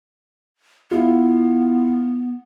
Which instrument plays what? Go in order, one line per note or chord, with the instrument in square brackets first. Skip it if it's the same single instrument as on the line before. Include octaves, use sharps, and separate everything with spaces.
[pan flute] B3 [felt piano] E4 F4